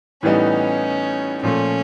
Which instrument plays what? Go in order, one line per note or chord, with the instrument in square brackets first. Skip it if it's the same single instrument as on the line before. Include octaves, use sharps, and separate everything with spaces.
[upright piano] A2 E3 G3 B3 D#4 [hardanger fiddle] C#4
[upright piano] A#2 F3 A3 [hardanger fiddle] C#4